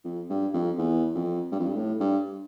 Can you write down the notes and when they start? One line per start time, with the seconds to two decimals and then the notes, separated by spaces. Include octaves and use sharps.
0.04 F2
0.29 G2
0.53 F2
0.78 E2
1.15 F2
1.52 G2
1.59 F2
1.66 G2
1.76 A2
2.00 G2